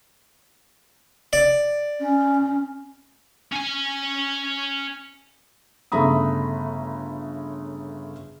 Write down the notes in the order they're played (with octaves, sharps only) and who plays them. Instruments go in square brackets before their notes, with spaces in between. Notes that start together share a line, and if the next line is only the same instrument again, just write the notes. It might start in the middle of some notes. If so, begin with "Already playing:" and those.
[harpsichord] D5
[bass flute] C#4
[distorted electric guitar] C#4 G#5
[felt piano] G1 C#3 A3 A#5 B5 D#6